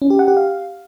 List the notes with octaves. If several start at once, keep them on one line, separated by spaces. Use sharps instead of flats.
C#4
G4
F#5
G4
F5